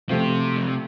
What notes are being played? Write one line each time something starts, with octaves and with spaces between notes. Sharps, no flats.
C3 F3 A3 C4 F4
F2